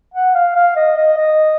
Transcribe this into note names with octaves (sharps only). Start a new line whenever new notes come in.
F#5
F5
F5
D#5
D#5
D#5